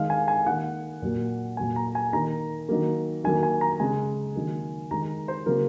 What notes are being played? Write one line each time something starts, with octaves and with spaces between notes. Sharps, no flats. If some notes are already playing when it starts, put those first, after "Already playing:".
Already playing: D#3 G#3 F5
G#5
G#5
D#3 A#3 F#5
A#2 F#3 A#3
A#2 F#3 A#3 G#5
A#5
G#5
D#3 A#3 A#5
D#3 F#3 A#3
D#3 F#3 A#3 G#5
G#5
A#5
C#3 G#3 G#5
D#3 F#3 A#3
D#3 G#3 A#5
C5
C#3 F#3 A#3 A#4